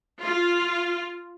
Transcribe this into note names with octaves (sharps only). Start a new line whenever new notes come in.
F4